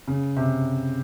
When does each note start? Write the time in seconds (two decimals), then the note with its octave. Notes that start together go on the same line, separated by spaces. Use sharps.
0.08 C#3
0.36 C3